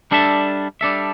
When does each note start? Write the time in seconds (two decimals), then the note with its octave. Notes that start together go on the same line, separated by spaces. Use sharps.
0.11 G3 D4 A4 E5
0.81 G3 D4 A4 E5